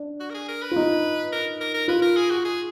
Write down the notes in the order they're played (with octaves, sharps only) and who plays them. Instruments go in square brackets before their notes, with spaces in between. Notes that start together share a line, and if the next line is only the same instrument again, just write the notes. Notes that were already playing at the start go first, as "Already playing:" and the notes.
Already playing: [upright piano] D4
[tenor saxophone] F#4
A#4
G#4
A#4
B4
[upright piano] F4
D#4
[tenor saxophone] A#4
A#4
A#4
[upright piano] F4 [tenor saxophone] B4
[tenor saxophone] A#4
G#4
F#4
G#4